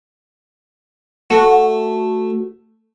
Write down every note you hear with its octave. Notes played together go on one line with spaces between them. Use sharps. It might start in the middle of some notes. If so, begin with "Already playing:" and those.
A3 F#4